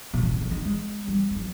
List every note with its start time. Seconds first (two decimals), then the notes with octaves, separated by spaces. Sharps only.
0.14 A#2
0.23 B2
0.32 C3
0.41 D3
0.51 D#3
0.65 G#3
1.08 G3
1.31 F3
1.36 F#3